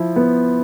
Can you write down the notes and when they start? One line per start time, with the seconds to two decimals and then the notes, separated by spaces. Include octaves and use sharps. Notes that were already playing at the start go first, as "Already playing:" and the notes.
Already playing: F3 E4
0.16 B3